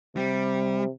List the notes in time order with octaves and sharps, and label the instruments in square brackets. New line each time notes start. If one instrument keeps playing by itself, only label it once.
[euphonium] C3 [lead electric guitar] G3